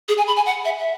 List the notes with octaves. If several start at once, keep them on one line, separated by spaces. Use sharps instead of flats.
G#4
G#5
B5
G#5
F#5
E5
E5